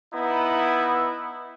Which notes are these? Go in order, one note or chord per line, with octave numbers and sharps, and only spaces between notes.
B3 D#4 E4